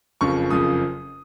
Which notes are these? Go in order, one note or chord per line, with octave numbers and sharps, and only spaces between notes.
F#1 F2 C#3 F3 C#6
F#1 F2 C#3 F3 D#6